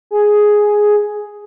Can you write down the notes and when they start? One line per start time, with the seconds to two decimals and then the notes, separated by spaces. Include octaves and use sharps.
0.11 G#4